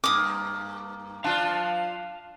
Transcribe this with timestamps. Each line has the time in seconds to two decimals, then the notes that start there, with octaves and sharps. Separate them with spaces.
0.04 G2 A#3 D6 D#6
1.24 D4 F4 F5 A5